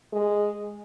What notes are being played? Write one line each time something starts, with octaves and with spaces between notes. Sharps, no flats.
G#3